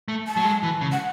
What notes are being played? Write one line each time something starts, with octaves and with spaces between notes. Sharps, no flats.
A3
A5
F#3
G#3
E3
C#3
F#5